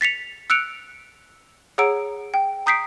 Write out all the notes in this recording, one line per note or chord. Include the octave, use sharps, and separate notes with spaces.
A6 B6 C#7 F7
E6 F#6 C#7 D7 F7
G#4 C#5 F#5 A#5 E6 D7
G5
A#5 D#6 G6 B6 C7 D7